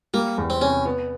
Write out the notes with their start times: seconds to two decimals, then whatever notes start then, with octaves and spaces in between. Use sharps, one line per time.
0.14 G3 A#3
0.38 E2
0.50 C4
0.61 C3 C#4
0.85 B3